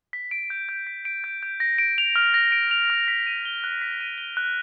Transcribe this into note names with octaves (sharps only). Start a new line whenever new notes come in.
B6
D7
G6
G6
B6
D7
G6
G6
A#6
D7
F7
F6
A#6
D7
F7
F6
B6
D#7
G7
F#6
B6
D#7
G7
F#6